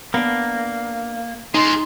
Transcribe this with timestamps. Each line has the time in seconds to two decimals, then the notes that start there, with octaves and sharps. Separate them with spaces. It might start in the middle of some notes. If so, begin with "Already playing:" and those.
0.14 A#3 B3 D4
1.54 G#3 D#4 F4 C6